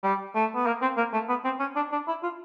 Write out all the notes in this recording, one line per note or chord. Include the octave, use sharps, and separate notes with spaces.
G3
A3
B3
A#3
C4
A#3
A3
B3
C4
C#4
D4
D4
E4
F4